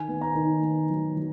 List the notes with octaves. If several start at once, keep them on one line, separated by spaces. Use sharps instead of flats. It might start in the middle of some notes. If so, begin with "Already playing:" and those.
Already playing: D#3 G#5
B3
A#5
D#3
B3
F#3
F#3